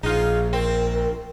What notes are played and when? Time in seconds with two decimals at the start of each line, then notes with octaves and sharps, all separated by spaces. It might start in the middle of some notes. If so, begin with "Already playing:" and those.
0.03 A#1 D#4 F4 G#4
0.53 C4 A#4